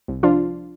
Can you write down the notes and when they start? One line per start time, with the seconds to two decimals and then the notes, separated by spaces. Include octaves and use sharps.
0.08 C2
0.23 F3 D4 F4